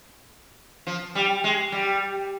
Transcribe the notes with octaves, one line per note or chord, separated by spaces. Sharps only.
F3
G3
G#3
G3